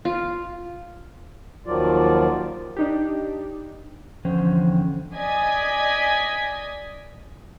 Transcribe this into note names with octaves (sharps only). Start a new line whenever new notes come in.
F4
D#2 D#3 F3 F#3 F4 D5
D4 D#4 G4
E2 D3 F3 C#4 C5 G5
D5 D#5 G#5 D#6 G#6 B6